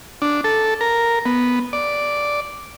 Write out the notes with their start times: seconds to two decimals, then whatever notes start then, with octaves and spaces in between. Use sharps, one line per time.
0.22 D4
0.44 A4
0.81 A#4
1.26 B3
1.73 D5